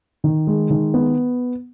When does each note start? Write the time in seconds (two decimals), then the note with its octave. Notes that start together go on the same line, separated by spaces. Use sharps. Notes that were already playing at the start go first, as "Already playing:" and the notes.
0.24 D#3
0.47 G#3
0.70 D#3
0.94 B3